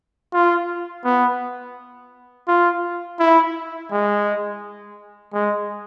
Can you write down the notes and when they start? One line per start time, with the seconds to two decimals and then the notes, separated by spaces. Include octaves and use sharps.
0.33 F4
1.04 B3
2.48 F4
3.19 E4
3.91 G#3
5.33 G#3